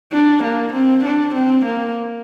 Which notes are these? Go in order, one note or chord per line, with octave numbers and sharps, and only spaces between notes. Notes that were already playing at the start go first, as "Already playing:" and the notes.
D4
A#3
C4
D4
C4
A#3